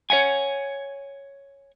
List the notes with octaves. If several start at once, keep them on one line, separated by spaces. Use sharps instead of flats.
C#5 E5 F#5 G#5